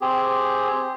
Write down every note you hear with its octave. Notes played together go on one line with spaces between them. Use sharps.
C4 G4 G#4